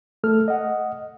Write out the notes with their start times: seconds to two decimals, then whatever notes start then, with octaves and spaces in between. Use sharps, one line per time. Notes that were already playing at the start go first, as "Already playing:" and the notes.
0.24 A3 A4 F6
0.48 D#5 F#5